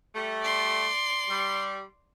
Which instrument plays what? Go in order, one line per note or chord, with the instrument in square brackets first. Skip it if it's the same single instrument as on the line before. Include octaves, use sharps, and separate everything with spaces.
[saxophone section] G3 A3
[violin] D5 C6
[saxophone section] G3